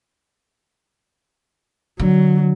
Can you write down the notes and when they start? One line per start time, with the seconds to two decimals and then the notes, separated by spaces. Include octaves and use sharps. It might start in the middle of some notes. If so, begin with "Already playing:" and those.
2.00 D3 F#3